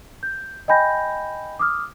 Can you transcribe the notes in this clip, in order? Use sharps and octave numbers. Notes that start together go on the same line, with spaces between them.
G6
D#5 G5 G#5 B5 G6 A#6
D6 D#6 F6